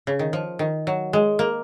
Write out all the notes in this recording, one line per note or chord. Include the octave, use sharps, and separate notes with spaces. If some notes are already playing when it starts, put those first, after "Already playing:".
C#3
D#3
F3
D#3
F#3
G#3
A#3